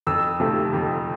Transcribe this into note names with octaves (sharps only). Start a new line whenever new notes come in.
F2 E6
C3 F3 A3
F2